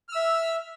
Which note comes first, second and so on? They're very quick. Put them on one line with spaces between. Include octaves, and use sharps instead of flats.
F6 E6 E5